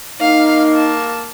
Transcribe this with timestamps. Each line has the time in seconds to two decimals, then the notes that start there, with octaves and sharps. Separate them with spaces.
0.21 A#3 D#4 F5
0.75 A5